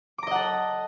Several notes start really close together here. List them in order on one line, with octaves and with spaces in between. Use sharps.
D6 A#5 D#5 F#5 A4